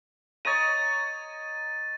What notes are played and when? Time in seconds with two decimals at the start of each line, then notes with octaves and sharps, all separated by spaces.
0.45 C#5 D#5 A#5 A6 D#7